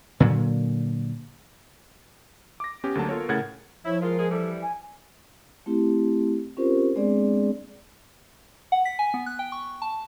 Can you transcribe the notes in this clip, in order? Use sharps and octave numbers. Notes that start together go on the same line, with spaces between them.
A#2 D3 F#3
D6 A#6
B3 C#4 G4
D2 D3 F#3 A#3 A5
B3 F4 A4 A#4 C#5
A2 C#3 A#4 F#5 G#6 A6
F3 E4 C#5
G#3 F4 A#4
G#3 G#4
E3 G3 A4
G#5
A3 C4 E4 G4
C4 C#4 F4 G4 A#4 C5
G#3 B3 C4 D4 G#4 D5
F#5
B6
G#5
B3
F#6
G5
C#6
A5